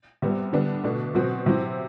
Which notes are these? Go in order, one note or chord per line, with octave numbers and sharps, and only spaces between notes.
C3 G3 B3
D3 G3 B3 D4
B2 A3 D4
B2 F#3 C4 F#4
C3 F#3 C4 E4